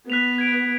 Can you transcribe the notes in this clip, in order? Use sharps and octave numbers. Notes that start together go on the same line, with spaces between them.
B3 F#6 B6 F7
G#6 D7 F7